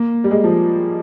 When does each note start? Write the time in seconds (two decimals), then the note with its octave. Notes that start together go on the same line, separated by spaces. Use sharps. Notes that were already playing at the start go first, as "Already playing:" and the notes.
Already playing: A#3
0.24 G3
0.31 G#3
0.44 F3